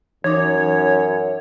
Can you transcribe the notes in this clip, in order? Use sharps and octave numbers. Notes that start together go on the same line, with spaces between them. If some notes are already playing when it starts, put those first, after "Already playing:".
F#2 E3 D#4 C#5 D6